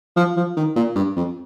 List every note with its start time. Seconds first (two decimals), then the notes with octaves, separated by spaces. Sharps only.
0.16 F3
0.36 F3
0.57 D#3
0.76 A#2
0.96 G2
1.16 F2